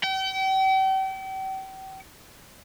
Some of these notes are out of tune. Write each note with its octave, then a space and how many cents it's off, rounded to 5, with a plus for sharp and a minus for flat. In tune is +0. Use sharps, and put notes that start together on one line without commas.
G5 -40